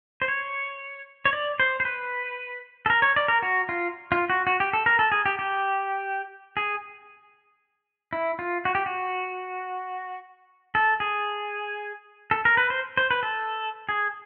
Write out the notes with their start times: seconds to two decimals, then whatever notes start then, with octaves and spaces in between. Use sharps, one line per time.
0.22 C5
0.28 C#5
1.25 C#5
1.33 D5
1.60 C5
1.80 C5
1.85 B4
2.86 A4
2.90 A#4
3.02 C#5
3.16 D5
3.28 A#4
3.42 F#4
3.69 F4
4.12 F4
4.30 F#4
4.47 F#4
4.60 G4
4.73 A4
4.86 A#4
4.99 A4
5.12 G#4
5.26 G4
5.39 G4
6.57 G#4
8.13 E4
8.39 F4
8.65 F#4
8.75 G4
8.86 F#4
10.75 A4
11.00 G#4
12.31 A4
12.45 A#4
12.57 B4
12.70 C5
12.97 C5
13.11 B4
13.23 A4
13.89 G#4